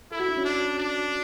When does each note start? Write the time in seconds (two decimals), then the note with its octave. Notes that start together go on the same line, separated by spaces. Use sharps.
0.12 E4 A4
0.20 F#4
0.29 D4
0.37 C#4
0.45 D4
0.78 D4